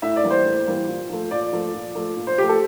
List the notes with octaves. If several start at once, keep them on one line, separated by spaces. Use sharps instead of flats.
A2 E5
D5
E3 G3 A#3
C5
A2
E3 G3 A#3
A#2
F3 A3
A#2 D5
F3 A3
A#2
F3 A3
A#2
C5
F3 A3 G4
A4